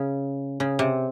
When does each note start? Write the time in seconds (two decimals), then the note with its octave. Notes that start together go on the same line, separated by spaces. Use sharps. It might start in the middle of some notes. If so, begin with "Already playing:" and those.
Already playing: C#3
0.60 C#3
0.79 C3